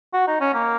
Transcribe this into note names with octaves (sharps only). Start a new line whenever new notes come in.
F#4
D#4
C#4
A#3